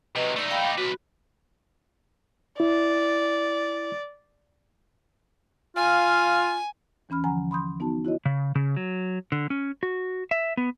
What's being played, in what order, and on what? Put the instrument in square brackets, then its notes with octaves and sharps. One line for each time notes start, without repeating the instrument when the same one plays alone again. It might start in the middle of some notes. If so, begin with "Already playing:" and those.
[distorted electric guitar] C3 F#3 [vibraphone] B4 D#5
[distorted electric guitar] A3 D#4 [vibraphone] D5 E6
[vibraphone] F5 G5 B5
D6
[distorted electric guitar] B1 B4 [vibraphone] F#4
[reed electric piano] E4 [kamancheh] D5
[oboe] F4 [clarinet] F5 [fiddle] G#5
[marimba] D#2 E3 C#4 B5 F6
D3 F3 F#5 G#5 A#5
B5 C6 D#6 G6
B3 D#4 F#4 A5
E4 F#4 C#5 D#5
[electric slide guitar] C#3
C#3
F#3
D3
C#4
F#4
E5
B3